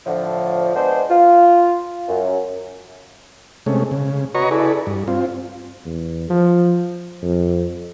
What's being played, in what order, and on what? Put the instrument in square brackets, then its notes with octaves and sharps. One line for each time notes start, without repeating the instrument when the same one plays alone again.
[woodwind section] A2 D3 F3
G#3 B3 D4 C5
F4
F#2
[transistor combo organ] C3 G#3 A3 C#4
C#3
F#4 B4 C#5 D#5 A#5 C#6
E4 G#4 A4 B4 D5
G2
C4 F4
[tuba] E2
F3
F2